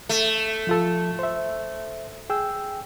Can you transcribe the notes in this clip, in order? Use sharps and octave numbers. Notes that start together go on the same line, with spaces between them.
A3
F3 F4 A4
C5 E5
G#4 G5 E6